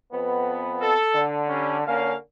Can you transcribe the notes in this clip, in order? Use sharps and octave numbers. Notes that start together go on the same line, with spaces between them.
F2 B3
A4
D3
G3 C#4
D3 A#3 C#4 F5